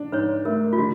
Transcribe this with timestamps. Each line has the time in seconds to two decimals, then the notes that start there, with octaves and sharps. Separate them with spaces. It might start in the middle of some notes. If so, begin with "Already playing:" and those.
Already playing: D4
0.12 G#2 B4 C#5
0.45 A3 A#4
0.73 F4
0.78 D3 F#4